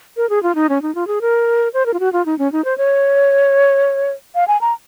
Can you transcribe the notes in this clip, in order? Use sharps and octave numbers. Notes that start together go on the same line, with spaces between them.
A#4
G#4
F4
D#4
C#4
D#4
F4
G#4
A#4
C5
A#4
F4
F#4
F4
D#4
C#4
D#4
C5
C#5
F5
G#5
A#5